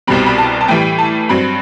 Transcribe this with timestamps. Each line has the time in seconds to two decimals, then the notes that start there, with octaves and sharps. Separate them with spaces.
0.07 C2 B2 G3 C4 B5
0.27 B5
0.38 A5
0.61 A5
0.68 A2 E3 G3 G5
0.99 A5
1.29 G2 F#3 C4 B5